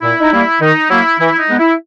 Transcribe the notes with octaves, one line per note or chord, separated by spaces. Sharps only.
A#2 E4
D#4
G3 A#3 E4
D#3 D#4
F#3 A#3 E4
E3 E4
D#4
G#3 B3
E4